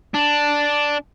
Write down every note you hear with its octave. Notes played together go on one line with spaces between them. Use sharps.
D4